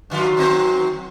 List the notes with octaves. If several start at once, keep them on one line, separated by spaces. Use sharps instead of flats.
G2 D#3 F#3 F4
D#3 C4 C5